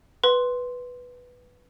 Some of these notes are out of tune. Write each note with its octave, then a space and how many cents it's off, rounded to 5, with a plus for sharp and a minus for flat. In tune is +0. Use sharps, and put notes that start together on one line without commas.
B4 +0 C6 +0